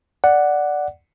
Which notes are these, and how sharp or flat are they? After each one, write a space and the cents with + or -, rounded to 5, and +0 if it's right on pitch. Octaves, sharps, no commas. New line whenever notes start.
D5 +0 F#5 +0